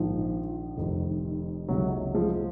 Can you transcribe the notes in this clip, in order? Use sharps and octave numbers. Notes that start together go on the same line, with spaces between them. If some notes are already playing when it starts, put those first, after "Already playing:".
Already playing: A#1 G#2 D#3 F3
F1 F2 D#3
C#2 C3 D#3 F#3
F3 G#3